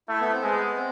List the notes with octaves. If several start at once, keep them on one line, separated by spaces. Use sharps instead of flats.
A3 E4
B3
C4
G#3 B3
C4